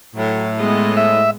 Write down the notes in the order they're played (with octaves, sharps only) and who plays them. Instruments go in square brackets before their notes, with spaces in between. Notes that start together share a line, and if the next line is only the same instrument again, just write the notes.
[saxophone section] A2 [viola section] F#3
[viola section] G#3 B3 D#5
[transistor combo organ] E5